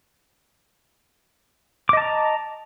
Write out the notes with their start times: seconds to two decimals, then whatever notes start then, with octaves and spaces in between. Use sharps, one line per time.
1.89 D6
1.93 D#5
1.97 A5
2.01 A#5